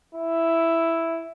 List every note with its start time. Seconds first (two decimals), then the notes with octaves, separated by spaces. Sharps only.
0.15 E4